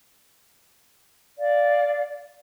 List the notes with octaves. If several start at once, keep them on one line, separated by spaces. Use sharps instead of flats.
D5 F5